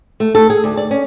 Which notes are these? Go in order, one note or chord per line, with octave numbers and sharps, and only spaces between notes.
A3
A4
G#4
D2
D5
C#4